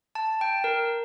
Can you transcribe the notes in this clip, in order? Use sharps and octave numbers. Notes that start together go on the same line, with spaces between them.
A5
G5
A#4